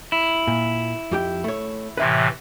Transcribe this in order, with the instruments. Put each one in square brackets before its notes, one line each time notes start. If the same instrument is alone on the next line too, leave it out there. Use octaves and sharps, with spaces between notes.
[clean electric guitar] E4
[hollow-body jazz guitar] A#2
F2 G4 G5
A3 C#5
[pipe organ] A2 C3 E3 [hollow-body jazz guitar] B4 E5 C6